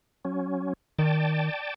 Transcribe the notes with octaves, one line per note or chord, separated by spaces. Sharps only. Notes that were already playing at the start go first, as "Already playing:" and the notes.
F#3 C#4
D#3 D5 G5 A5